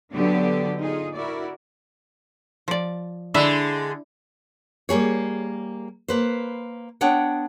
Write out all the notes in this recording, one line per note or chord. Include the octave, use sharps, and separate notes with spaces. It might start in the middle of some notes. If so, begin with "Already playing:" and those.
D3 F#3 B3 D4 G4 D5
D#4 F4 G#4
E4 F#4 A#4 D5
F3 D5
D3 G#3 D4 E4 E5
G3 A#3 G#4 C#5
A#3 B4 C5
B3 D4 C#5 F#5 G5